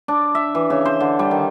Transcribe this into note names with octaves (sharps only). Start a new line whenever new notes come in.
D4
E5
E3
C#3
C5
D3
G3
D#3